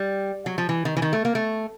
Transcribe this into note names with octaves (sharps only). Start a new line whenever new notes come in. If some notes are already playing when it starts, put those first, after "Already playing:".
Already playing: G3
F#3
F3
E3
D#3
E3
D#3
A3
A#3
A3